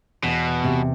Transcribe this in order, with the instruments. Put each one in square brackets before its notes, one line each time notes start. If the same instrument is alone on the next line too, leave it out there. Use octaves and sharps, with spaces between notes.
[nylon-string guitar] E2 [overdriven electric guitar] B2
[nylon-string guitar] C3